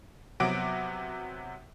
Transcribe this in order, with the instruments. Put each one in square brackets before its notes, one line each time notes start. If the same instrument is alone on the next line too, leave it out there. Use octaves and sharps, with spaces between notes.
[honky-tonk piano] C3 F#3 B3 F#4 D6 D7